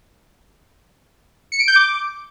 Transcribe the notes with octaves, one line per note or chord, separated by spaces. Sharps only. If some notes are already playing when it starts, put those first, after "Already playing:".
C#7
D7
G6
D6